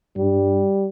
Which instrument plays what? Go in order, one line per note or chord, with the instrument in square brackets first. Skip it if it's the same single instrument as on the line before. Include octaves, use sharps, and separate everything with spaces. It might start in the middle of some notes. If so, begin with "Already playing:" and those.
[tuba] G2 [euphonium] G3